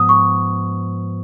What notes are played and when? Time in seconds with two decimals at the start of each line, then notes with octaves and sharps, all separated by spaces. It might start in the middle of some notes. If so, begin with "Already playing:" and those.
Already playing: G#2 F3 B3 D#6
0.09 C#6